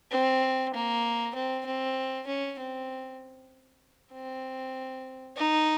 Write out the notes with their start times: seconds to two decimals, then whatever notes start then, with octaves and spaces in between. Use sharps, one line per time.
0.12 C4
0.74 A#3
1.35 C4
1.66 C4
2.27 C#4
2.59 C4
4.13 C4
5.37 D#4